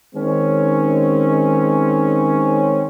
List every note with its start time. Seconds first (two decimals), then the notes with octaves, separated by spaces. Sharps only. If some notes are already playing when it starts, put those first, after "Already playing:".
0.15 D#3 G#3 C4 C#4